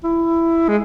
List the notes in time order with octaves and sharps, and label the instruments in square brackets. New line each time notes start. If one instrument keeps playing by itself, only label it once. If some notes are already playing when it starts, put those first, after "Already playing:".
[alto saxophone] E4
G#3